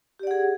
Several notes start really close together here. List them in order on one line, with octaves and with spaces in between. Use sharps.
G4 D5 F#5 G#4